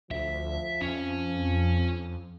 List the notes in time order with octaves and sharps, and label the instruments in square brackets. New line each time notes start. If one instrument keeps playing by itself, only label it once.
[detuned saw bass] D2 [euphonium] F3 [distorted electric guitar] E5
[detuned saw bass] F2 [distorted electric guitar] C#4